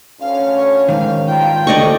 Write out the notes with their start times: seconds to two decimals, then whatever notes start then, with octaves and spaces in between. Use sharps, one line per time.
0.21 D2 C#4 F5
0.57 C#5
0.89 G#2 D#3 F5
1.27 G2 A#2 F4 G5
1.67 F2 C3 A4 D5 D#5 C#6